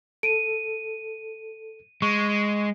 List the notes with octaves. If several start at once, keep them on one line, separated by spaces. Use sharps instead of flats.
A4 D7 D#7
G#3 C#6